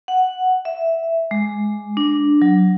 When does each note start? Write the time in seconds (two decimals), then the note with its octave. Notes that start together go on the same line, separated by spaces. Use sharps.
0.08 F#5
0.65 E5
1.31 G#3
1.97 D4
2.42 F#3